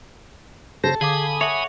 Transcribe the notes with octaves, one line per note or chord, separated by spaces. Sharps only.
C#3 A4 C5 A#6
D3 G#4 F5 G#5 B5 D6 D#6
C#5 E5 F#5